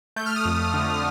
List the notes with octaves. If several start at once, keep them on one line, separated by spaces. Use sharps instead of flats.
A3 G6
F6
D#6
F2 F6
D3